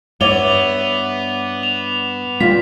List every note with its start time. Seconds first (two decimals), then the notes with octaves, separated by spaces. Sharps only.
0.21 G2 B3 C#5 D5 E5 D6 F7 G7
1.63 E7 F7
2.40 G3 F4 G5 B6